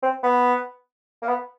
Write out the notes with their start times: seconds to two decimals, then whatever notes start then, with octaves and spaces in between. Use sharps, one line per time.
0.03 C4
0.23 B3
1.22 A#3
1.28 B3